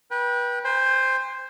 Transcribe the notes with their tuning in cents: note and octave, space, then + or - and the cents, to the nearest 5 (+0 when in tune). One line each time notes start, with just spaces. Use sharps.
B4 -30 G5 +0
C5 +0 G5 +45